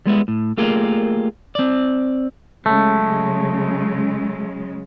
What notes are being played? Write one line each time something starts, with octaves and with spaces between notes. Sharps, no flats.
G3 G#3 B3 E4
A2
A3 A#3 F4 G4 G#4 A#4
C4 D5
C#3 F#3 G#3 A3